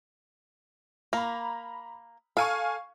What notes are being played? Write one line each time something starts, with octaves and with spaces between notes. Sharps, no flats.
A#3 A#5 B5
A4 F5 G#5 C#6